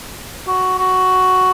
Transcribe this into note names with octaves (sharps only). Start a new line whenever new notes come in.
F#4
F#4